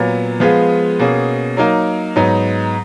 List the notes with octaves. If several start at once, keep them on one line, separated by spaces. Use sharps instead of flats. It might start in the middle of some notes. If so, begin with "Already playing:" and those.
Already playing: A#2 F#3 B3
F3 G#3 B3 F4 G#4
B2 A#3 C#4 G#4
F#3 A#3 D#4 A#4
G#2 F#3 B3 D#4